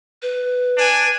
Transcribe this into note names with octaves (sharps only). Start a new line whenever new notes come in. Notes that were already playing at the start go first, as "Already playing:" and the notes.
B4
D4 G#5